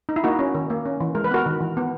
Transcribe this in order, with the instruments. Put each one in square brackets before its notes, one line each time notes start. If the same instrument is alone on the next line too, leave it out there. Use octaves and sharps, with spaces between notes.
[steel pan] D#4
E4
A#3 D#4 F#4
C#4
D#3
A#3
C#4
E3
G#3 A#4
B4
B3 F#4 A#4
D#3
E3
B3